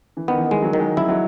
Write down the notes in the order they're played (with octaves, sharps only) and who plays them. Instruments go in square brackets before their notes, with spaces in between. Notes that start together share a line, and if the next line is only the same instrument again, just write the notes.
[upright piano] E3
[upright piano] D#3 [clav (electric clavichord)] B3
[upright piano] E3
D#3
[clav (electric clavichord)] G#3
[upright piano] F#3
[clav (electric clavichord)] D#3
[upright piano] G#3
[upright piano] F#3 [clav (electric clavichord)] E4
[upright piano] F#3